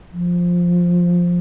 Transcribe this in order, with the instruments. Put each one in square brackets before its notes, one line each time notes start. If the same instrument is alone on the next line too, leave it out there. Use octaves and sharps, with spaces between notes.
[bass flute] F3